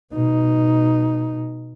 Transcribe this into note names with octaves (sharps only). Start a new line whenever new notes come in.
B2 D#4